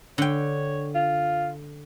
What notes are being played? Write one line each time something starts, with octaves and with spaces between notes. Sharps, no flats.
D3 C#5 G5
F4